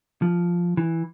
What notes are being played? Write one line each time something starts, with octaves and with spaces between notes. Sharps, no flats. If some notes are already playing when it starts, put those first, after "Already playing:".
F3
E3